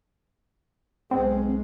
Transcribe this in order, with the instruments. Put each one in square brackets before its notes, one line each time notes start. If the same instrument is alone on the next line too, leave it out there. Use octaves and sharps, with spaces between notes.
[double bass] B1 G#3 [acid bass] C4